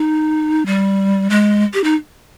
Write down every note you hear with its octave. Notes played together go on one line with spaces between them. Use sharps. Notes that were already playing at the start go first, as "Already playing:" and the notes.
Already playing: D#4
G3
G#3
G4
D#4